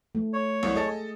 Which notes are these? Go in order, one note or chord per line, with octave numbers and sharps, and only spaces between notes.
A3
C#5
C2
G#4 A4 D#5